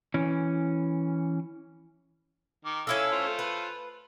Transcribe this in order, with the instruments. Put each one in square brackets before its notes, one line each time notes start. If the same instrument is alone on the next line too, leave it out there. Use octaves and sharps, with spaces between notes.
[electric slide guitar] E3 C#4
[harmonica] D#3 D6
[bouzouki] C#4 E4 A4 [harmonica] F5 E6
[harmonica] A3 F4 C5
[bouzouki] B4